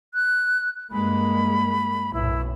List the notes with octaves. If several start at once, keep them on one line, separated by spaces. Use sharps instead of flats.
F#6
G2 G#3 A#3 B5
B1 F#2 A2 E4